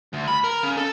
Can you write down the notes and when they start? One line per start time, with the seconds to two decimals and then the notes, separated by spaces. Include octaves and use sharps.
0.13 D2
0.28 B5
0.44 A#4
0.63 C#3
0.78 A4